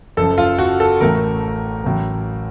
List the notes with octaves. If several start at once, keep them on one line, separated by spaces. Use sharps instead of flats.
F#1 F#2 F3 A4
F4
F#4
A4
A1 A2 A3 A#4
A1 A2 F#3